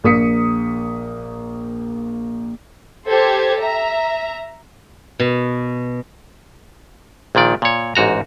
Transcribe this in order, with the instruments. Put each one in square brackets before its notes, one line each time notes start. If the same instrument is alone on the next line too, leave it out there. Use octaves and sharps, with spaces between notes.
[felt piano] A#1 A#3 D#6 B6 C#7
[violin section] G4 A4 C5 G#6
E5 A#5
[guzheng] B2
[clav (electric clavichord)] A#1 A#2 D#3 D5
A#2 C#5
A1 G#2 F#4 A#5